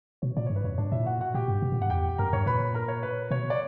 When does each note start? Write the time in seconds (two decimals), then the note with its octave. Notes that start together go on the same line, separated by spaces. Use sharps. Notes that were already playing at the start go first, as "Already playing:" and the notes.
0.22 B2 C#5
0.37 A#2 D5
0.46 G2 C#5
0.56 B4
0.64 F#2 C#5
0.78 G2 D4 D5
0.92 A#2 E4 E5
1.06 F#4 F#5
1.20 F#4 F#5
1.34 A#2 G4 G5
1.48 G2
1.62 B2
1.72 A#2
1.81 G2 F#5
1.90 E2 G4 G5
2.18 F#2 A#4 A#5
2.33 G2 C#5 C#6
2.46 A#2 B4 B5
2.74 A#4 A#5
2.88 C#5
3.03 B4
3.31 B2 C#5
3.50 D5